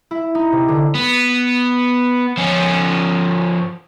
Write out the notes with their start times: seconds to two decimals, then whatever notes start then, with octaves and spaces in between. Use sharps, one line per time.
0.11 E4
0.35 D#4
0.52 C3
0.68 D3
0.94 B3
2.37 F3 C#4